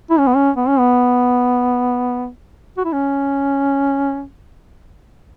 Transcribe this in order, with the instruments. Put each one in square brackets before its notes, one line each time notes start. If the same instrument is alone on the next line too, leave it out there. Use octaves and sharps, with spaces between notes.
[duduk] E4
C#4
B3
C#4
B3
C#4
B3
F#4
E4
C#4